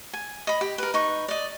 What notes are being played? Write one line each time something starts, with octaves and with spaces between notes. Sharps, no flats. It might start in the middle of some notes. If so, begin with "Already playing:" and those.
G#5
D#5 B5
G4
A#4 B4
D#4 B4 C#6
D5 D#5